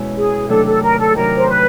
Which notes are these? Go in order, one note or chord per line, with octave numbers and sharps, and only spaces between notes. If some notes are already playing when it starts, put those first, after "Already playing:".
Already playing: B2 G#3 C#4 E4
G#4
C3 D#3 F#3 A3 D4 A4
A4
A#4
A4
C3 D#3 F#3 A3 D4 A#4
C5
B4